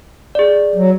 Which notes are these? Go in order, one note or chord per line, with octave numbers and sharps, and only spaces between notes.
G#4 D5
F#3